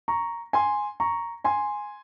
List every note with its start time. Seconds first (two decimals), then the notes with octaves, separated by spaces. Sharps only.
0.08 A#5 C#6
0.53 G#5 C6
1.00 A#5 C#6
1.44 G#5 C6